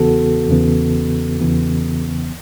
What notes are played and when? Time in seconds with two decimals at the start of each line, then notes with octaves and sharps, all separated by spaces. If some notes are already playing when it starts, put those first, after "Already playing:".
Already playing: E2 C#3 E3 B3 F#4 A4
0.49 E2 C#3 E3 B3
1.41 E2 C#3 E3 B3